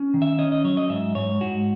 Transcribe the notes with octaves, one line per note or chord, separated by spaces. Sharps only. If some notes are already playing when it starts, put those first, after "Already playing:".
Already playing: C#4
D#3
E5
C#4 D#5
D#5
F#3 C#5
D#5
G#2 E5
G#2 C#5
G#2 F#4